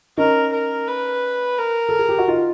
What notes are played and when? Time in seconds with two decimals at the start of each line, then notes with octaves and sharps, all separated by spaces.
0.17 C#4 D#4 A#4
0.53 A#4
0.88 B4
1.59 A#4
1.89 A4
1.99 G#4
2.09 G4
2.19 F#4
2.28 D#4 F4